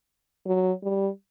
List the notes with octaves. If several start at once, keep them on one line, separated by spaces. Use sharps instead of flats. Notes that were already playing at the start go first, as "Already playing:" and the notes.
F#3
G3